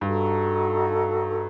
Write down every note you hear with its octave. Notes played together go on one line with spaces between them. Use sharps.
G2 D#4 F#4 A4